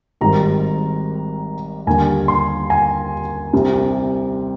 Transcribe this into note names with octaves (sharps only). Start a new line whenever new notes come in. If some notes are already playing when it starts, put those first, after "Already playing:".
G#1 G#2 D#3 G3 A#5
D#2 D3 G3 G#5
C6
G#5
C2 C3 G3